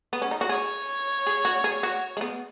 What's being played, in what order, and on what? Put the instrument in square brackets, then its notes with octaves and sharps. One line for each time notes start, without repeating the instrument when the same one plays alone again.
[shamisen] B3
C#4
D#4
F#4
[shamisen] G#4 [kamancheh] C#5
[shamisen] G#4
F#4
G#4
F#4
G#3
B3